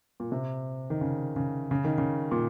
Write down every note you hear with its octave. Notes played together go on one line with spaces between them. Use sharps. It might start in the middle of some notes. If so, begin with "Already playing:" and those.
A#2
C3
D#3
C#3
C#3
C#3
D#3
C#3
A#2